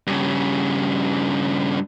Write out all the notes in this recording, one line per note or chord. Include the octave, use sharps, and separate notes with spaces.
G2 C#3